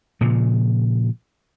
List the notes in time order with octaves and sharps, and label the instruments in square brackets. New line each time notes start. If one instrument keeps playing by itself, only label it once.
[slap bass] A#2 C#3 F3